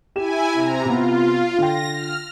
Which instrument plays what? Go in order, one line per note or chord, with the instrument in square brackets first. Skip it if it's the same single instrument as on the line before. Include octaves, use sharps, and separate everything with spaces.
[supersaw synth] E4 G#5 [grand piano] G4 E7
[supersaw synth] C3 A#5
[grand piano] C3 B3 [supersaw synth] F4
[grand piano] D3 G5 [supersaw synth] A#6
[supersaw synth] F6